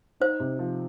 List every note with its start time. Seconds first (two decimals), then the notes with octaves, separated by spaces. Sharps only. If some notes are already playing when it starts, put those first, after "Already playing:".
0.20 D#4 C5
0.40 C3
0.59 F3